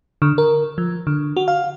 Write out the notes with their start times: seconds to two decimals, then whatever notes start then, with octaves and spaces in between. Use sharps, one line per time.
0.22 D3
0.38 A#4
0.78 F3
1.07 D3
1.37 F#4
1.48 F5